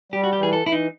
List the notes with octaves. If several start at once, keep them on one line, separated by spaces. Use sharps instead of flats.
G3 G4
F#4
G4
E3 G#4
A4
E3 E4
D#4